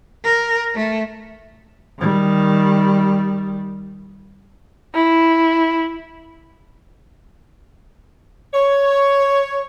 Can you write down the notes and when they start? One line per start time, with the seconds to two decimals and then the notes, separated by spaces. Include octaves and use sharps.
0.24 A#4
0.75 A3
1.99 D#3 G3
4.95 E4
8.54 C#5